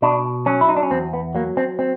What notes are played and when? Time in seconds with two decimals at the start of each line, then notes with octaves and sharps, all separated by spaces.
0.02 B2 D4
0.46 F#3 C#4
0.61 E4
0.69 D#4
0.77 D4
0.83 C#4
0.91 E2 C4
1.13 B3
1.35 F#3 A#3
1.57 C4
1.79 C4